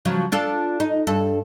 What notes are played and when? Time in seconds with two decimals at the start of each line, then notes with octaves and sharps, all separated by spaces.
0.05 C#3 F3 F#3
0.32 D4 F4 A4
0.80 D#4
1.07 G2 A4